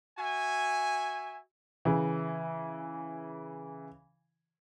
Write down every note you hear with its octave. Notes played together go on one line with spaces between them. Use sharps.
F#4 E5 G#5
C#3 E3